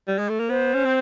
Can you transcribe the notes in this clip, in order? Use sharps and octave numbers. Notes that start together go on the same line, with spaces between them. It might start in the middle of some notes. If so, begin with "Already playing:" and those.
G3
G#3
A3
A#3
B3 C5
C#4
C4